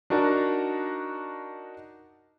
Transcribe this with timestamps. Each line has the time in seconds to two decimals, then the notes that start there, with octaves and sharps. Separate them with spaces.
0.10 D4 D#4 F#4 A#4 A5 A#5